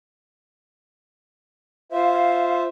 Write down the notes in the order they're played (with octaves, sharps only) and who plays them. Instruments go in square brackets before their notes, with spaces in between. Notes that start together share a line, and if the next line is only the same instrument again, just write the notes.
[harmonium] F4 C5 E5 [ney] F5